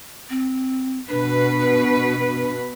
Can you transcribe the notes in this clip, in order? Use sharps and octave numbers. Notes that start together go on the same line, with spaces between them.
C4
B2 D4 B4